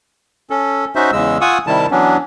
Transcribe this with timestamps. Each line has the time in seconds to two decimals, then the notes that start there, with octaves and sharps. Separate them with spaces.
0.50 C#4 A4
0.96 C#4 D#4 F#4 C5 E5
1.12 E2 C#3 G#3 E6
1.41 F4 F#5 G#5 C#6 D#6 E6
1.67 C3 D#3 G3 E4 A5
1.91 E3 F#3 B3 C#4 D4